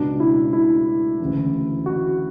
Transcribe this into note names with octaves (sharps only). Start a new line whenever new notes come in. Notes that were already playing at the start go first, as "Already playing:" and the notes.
Already playing: C#2 B2 D4
E4
E4
D2 C#3 E3
F#4